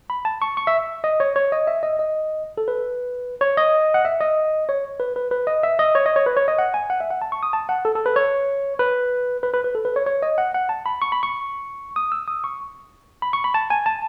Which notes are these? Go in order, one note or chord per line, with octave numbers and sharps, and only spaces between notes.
B5
A5
C#6
C#6
E5
D#5
C#5
C#5
D#5
E5
D#5
D#5
A4
B4
C#5
D#5
F#5
E5
D#5
C#5
B4
B4
B4
D#5
E5
D#5
C#5
D#5
C#5
B4
C#5
D#5
F#5
G#5
F#5
E5
F#5
A5
C#6
D#6
A5
F#5
A4
A4
B4
C#5
B4
B4
B4
B4
A4
B4
C#5
C#5
D#5
F#5
F#5
A5
B5
C#6
B5
C#6
D#6
E6
D#6
C#6
B5
C#6
B5
A5
G#5
A5